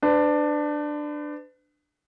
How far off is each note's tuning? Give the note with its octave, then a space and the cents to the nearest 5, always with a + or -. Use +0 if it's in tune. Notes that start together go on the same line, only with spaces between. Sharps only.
D4 +15 B4 +40